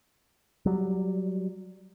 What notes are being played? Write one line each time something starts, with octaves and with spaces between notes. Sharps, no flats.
F#3 G3